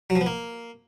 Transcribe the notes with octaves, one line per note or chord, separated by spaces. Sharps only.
F#3
F3
B3
A#3